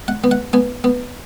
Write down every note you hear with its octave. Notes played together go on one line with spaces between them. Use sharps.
F#5
B3
F#5
B3 G#5
B3